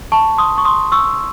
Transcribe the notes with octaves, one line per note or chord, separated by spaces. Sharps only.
A5 C#6
C6 D#6
C#6
C6 D#6
C#6 E6